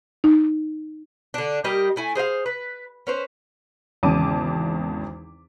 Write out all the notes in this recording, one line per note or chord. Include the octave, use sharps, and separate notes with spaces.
D#4
D3 D4
G3 A#3 G4 D#5
A3 E4 G#5
G#4 C5 D#5 F5
B4
C#4 B4 C5
G#1 E2 C#3 A5 D6 D#7